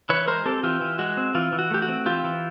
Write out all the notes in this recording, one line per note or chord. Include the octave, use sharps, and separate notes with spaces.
E3 B4 C#5
G#3 A#4 C5
C4 G4 A4
E3 F4 G4
E3
G#3 F#4
C4
E3 F4
E3
F#4
A3 G4
F#4
C4
E3 F4 G4
E3